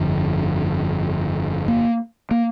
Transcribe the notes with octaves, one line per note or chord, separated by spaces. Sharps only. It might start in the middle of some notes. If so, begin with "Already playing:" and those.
Already playing: G1 F2 D3
A#3
A#3